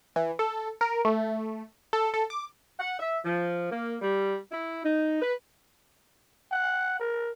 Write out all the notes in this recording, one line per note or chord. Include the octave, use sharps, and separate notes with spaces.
E3
A4
A#4
A3
A4
A4
D6
F#5
E5
F3
A#3
G3
E4
D#4
B4
F#5
A#4